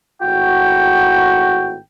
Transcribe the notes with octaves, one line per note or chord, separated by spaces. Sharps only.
G#1 A2 F#4 G5